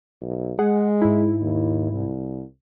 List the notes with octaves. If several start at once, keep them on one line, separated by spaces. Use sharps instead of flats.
B1
G#3 G#4 F#5
G#2 E4
D#2
C2